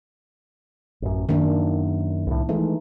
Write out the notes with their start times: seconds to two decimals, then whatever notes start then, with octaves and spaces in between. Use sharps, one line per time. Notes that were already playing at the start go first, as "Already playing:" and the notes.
1.02 A1 F#2
1.29 F#2 D#3 A#3 D4
2.27 C2 A2
2.49 E3 G#3 A3 D#4